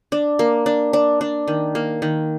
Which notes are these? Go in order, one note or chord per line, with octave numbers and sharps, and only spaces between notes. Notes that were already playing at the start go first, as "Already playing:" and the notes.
D4
A#3
D4
D4
D4
D#3
A#3
D#3